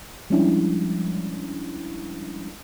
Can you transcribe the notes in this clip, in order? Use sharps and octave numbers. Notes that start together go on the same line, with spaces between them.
F3 G3 G#3 C#4 D4 E4